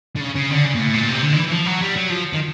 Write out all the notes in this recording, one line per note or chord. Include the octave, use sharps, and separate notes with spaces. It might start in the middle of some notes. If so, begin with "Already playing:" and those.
D3
C#3
C#3
D3
C#3
A#2
A2
A#2
C3
D3
D#3
E3
E3
F3
F#3
G3
F#3
F3
D#3